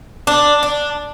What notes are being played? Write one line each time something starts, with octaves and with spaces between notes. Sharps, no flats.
D4
D4